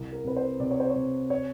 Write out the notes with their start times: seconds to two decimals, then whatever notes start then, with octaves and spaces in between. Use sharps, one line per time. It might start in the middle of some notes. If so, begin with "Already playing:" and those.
Already playing: C2
0.13 A#4
0.24 C3 B4
0.36 C5
0.60 C3 D5
0.71 C#5
0.80 C5
0.90 C#5
0.96 C3
1.30 C#5